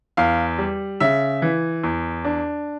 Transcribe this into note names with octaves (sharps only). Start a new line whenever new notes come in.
E2 F5
G3
C#3 E5
E3
E2
D4